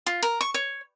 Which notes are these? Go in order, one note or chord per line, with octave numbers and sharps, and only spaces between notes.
F4
A#4
C#6
C#5